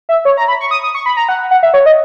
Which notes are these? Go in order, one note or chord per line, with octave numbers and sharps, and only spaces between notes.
E5
C#5
A#5
B5
C#6
D#6
D#6
C#6
B5
A#5
F#5
F#5
E5
C#5
D#5